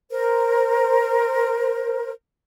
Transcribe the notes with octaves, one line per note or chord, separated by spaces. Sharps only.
A#4 C5